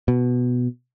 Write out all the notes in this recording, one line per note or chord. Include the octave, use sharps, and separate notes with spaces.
B2